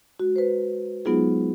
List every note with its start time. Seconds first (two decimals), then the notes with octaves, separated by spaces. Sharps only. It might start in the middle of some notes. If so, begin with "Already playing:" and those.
0.19 G#3 F#4
0.36 B4 C5
1.05 F#3 G#3 B3 D#4 F4 G#4